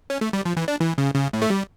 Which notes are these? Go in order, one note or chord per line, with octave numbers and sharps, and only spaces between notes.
C#4
A3
G3
F3
E3
D4
E3
C#3
C#3
A2
A3
G3